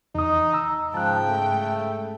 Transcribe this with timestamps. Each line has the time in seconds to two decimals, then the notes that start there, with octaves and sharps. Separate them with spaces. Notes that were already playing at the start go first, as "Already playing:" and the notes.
0.15 E2 D#4 D#6
0.53 A#5 E6
0.94 G#2 C#3 F3 G5 A5 F#6
1.29 A3